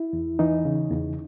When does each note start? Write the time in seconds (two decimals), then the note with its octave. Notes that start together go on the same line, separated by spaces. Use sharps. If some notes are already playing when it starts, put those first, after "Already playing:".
Already playing: E4
0.13 E2
0.39 E3 D#4
0.65 C#3
0.91 E2